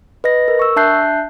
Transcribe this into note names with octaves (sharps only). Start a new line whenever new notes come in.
B4 D#5 A#6
A#4
C#6 E6
D4 E5 A5 F#6 G6 C7